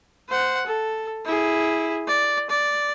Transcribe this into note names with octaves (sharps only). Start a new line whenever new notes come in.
C5 F#5
A4
E4 G#4
D5
D5